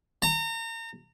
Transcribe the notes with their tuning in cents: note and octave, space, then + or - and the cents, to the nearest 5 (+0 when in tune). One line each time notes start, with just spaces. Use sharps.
A#5 -35